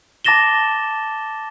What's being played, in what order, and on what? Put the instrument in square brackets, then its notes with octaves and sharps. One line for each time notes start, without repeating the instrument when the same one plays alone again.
[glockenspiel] A5 D6 A6 A#6 E7 G7